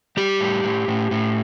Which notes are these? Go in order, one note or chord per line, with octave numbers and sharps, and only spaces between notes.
G3 G4
A2
A2
A2
A2